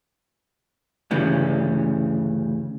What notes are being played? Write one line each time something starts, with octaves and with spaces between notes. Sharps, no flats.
D2 G2 C#3 E3 G3